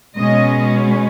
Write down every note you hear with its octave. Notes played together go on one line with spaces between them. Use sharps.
B2 G#3 C#4 D#5